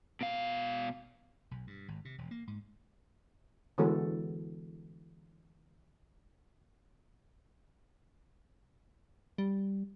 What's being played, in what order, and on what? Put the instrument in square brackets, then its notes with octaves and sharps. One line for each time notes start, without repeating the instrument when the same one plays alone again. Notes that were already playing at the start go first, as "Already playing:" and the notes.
[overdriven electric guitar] B2 F5
[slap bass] B1
G2
G#1
C3
E1
A#3
G#2
[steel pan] D3 E3 G#3 B3 F#4 A4
[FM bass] G3